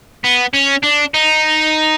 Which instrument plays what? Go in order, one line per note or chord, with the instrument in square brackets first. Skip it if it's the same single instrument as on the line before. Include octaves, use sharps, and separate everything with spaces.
[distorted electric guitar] B3
C#4
D4
D#4